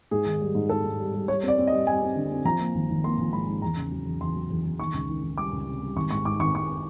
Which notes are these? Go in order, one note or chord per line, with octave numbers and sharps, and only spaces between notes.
G#2 G#4
D#3
G3
G#2
G#2 A4
G#2
G3
G3
G3 C#5
C4
D5
C4
D#5
G3
G3 G#5
C4
D3
C4
F3 A#5
A#3
G#1
G#1
A#3 C6
F3
G#2 B5
G#2
E2 A#5
C#3
F#3
E2
E2 C6
F#3
E2
E2
D#3 C#6
C#2
D#3
D#3
G3 D6
C#2
C3
G3
G#1 C#6
G#2 C#6
G#2 D6
G#1 C#6
G#2 C#6